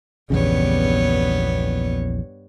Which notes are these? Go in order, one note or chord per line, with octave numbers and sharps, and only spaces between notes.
A#1 E2 G2 C#3 B3 C#5